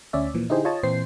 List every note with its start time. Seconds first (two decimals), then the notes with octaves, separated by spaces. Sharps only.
0.13 D2 C#4 D5 E5
0.34 A#2 E3 F3
0.49 D3 D#4 E4 G4 G#4 C5
0.65 F4 C#5 D#5 A5
0.83 A#2 E3 C4 C5 C7